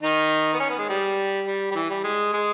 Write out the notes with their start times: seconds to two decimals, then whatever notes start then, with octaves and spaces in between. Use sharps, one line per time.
0.02 D#3 D#4
0.53 B3
0.60 C#4
0.70 B3
0.78 G#3
0.89 G3
1.46 G3
1.71 G3
1.75 E3
1.90 G3
2.04 G#3
2.33 G#3